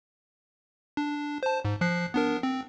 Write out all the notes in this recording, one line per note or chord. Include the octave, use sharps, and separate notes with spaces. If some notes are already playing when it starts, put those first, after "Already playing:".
D4
C5 A5
G#2
F3 F#6 C7
B3 D4 A#4
C4